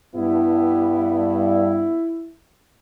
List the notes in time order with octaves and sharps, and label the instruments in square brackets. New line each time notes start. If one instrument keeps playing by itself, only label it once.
[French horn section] G2 [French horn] B3 [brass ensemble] E4